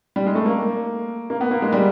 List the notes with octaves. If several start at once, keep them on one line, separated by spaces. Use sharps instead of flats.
G3
G#3
A3
A#3
A#3
B3
A#3
G#3
G3